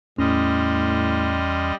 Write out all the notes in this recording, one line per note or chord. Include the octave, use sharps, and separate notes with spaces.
E2 A2 G3 C#4 D#5 C6 F6